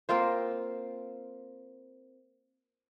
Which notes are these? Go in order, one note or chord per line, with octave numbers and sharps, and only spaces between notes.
A#3 C4 F4 C5